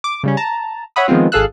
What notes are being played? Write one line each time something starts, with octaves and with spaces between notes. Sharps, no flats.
D6
C#3 G3 C#4
A5 A#5
C#5 E5 F#5 B5 D#6
D#3 F3 G#3 B3 C4 F4
G#1 G#4 A4 F5 E6 F#6